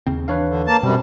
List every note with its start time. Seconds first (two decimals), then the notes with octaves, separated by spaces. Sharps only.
0.07 D#2 C#3 C4
0.28 D#2 E3 D4 B4 C#5 F5
0.48 D3
0.67 A#3 A5
0.83 F#2 B2 G3 C4